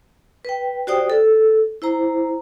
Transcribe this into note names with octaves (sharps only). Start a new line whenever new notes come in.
B4 G5
F#4 G4 C5 D5 G5 D#6
A4
E4 C5 A#5